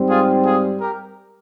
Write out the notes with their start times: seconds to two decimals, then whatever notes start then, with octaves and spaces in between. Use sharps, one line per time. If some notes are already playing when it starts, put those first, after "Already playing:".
Already playing: G#2 G3 C4
0.09 F4 G#4
0.44 F4 G#4
0.80 G4 A#4